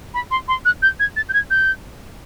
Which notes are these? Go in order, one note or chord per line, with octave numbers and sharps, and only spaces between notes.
B5
C6
C6
F#6
G6
G#6
A6
G6
G#6
G6